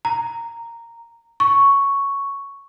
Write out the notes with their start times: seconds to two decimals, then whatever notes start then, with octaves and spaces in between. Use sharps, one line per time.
0.05 A#5
1.40 C#6